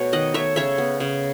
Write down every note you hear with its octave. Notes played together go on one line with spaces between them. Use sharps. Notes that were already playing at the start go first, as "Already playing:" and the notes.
Already playing: B2 A3 C#5
D#3 D#5 F#5
A3 C#5 E5
C#3 C#5 E5
B3
C#3